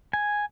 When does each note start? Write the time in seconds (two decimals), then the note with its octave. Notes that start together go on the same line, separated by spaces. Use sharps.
0.13 G#5